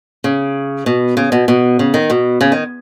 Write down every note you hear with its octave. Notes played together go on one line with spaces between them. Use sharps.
C#3
B2
C#3
B2
B2
C#3
D#3
B2
C#3
D#3